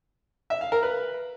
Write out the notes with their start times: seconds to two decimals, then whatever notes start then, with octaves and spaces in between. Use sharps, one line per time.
0.50 E5
0.61 F5
0.72 A#4
0.83 B4